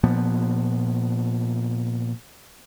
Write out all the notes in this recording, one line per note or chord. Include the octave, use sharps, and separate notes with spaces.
A#2 F3 B3